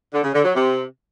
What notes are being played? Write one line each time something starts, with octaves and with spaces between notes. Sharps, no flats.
D3
C#3
D3
F#3
C3